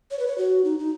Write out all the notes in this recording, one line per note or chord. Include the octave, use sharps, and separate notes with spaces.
C#5
B4
C#5
F#4
D#4
D#4